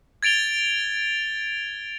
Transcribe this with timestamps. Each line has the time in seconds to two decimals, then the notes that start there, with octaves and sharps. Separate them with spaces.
0.23 G#6 A6 D7 F7 G7